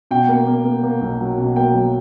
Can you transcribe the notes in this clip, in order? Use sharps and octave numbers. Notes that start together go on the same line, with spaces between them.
B2 G5
A#3
A#3
A#3
A#3
B1
F#3
B2
A#3 G5
F#3